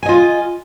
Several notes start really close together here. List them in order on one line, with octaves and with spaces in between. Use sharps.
G#5 D#5 F4